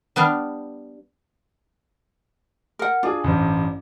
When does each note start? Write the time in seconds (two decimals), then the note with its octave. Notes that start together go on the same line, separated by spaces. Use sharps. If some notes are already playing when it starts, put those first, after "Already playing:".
0.16 G3 B3 D4 F5
2.79 A#4 F#5
3.03 D4 F4 G#4
3.24 A1 G2 C5